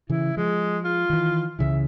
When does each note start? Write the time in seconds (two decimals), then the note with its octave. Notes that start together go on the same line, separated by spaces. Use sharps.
0.10 C#3 E3 E4
0.37 F3 G#3
0.85 F4
1.10 D#3 E3
1.59 C#2 C#3 E3 E5